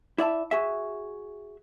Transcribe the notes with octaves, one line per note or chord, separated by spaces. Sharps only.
E4 D5 E5 A5
F#4 G#4 E5